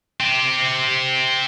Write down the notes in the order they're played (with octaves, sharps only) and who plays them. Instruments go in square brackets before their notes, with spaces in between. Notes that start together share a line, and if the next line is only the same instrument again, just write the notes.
[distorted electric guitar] C4 G4